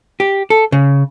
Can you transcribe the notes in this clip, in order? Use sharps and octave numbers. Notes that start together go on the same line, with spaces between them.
G4
A4
C#3